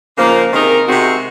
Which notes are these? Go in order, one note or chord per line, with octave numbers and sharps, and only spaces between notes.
C#3 F3 A#3 D#4
C3 D#3 G#3 D#4 A#4
C3 D#3 G#3 C4 F#4